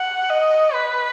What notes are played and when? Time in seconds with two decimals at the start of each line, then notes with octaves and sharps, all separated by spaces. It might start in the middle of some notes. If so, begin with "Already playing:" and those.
Already playing: F#5
0.30 D#5
0.73 B4